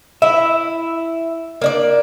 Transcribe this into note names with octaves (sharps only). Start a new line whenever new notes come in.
E4 E5
A#3 D4 D5